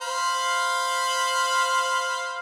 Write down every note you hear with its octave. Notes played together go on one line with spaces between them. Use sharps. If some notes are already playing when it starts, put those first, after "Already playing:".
C5 F5 B5